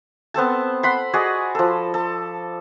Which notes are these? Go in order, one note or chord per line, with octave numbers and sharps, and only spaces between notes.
B3 C4 A4 A5
F#5 B5 C6
F#4 G#4 D5 D#5
F3 A4
A4